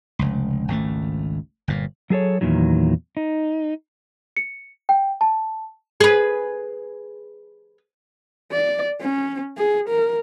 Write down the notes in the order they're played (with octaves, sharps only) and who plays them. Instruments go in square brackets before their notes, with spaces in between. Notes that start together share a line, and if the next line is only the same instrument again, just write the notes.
[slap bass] F1 C#2
G#1 C#2 C#3 A3
G1 A#2
[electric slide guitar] F#3 G#4 A4 C#5
E2 A#2 D#3 F#3
D#4
[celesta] C#7
G5
A5
[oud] G#4 B4
[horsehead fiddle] D5
C#4
G#4
A#4